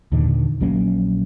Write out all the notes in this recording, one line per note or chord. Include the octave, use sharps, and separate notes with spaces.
D#2 A#2 D3 D#3
A#1 F#3 A#3 C#4